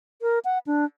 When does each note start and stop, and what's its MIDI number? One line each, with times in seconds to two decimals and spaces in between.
0.22 0.39 70
0.45 0.58 78
0.67 0.85 62